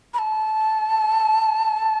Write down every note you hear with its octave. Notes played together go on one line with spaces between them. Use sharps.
B5
A5